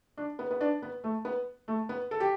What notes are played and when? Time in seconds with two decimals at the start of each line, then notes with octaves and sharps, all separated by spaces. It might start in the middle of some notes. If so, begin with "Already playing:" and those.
0.17 D4
0.39 B3
0.51 B3
0.61 D4
0.82 B3
1.04 A3
1.25 B3
1.68 A3
1.89 B3
2.11 A4
2.20 G4